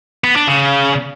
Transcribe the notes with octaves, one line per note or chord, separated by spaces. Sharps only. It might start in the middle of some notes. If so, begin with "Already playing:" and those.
B3
D4
C#3